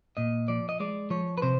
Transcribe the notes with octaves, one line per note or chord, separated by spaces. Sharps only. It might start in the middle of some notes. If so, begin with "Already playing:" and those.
A#2 D#5
F3 D5
D#5
G#3 D5
F3 C#5
B4
C3 C5